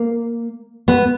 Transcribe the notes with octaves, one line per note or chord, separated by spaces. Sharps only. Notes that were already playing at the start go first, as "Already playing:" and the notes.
Already playing: A#3
B3